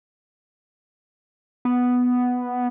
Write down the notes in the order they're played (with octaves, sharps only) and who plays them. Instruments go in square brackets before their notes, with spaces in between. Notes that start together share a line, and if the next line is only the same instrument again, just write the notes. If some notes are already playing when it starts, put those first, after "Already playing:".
[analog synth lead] B3